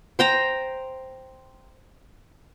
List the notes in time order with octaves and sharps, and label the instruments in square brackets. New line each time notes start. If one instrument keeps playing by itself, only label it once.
[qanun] C5 G5 A#5